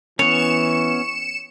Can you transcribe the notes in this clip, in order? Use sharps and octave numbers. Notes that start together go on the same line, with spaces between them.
E3 B3 C#4 C#5 C#7 E7